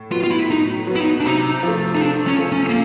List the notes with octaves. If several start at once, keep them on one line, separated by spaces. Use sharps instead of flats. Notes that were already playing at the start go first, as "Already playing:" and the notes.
Already playing: A2
F#3 B3 F4
F4
E4
A2 D#4
F#3 B3
E4
D#4
D4
C3 D#4
F3
A3
D#4
C3 D4
C#4
F3 A3
C#4
A#3